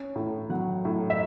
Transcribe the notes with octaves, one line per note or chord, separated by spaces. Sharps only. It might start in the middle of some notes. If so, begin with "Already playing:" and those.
Already playing: C#4
A2
F#3 F#5
A2
E5